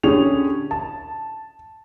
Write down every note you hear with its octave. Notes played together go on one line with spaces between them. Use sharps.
D3 C#4 G4 G#4 F7
A5